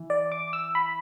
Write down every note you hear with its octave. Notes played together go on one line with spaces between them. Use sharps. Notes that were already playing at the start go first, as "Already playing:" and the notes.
Already playing: E3
D5
D6
E6
B5